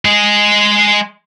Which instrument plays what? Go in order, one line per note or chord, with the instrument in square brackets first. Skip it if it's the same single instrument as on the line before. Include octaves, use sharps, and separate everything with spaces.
[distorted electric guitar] G#3 G#4